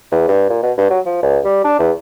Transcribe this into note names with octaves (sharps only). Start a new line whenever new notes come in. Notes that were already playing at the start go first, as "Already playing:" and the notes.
E2
G2
A#2
B2
G2
F#3
F3
C#2
G3
D4
E2